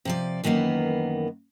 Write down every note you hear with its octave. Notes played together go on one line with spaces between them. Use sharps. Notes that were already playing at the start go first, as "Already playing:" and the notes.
C3 F3 D5
F#2 D#3 E3 A#3 B3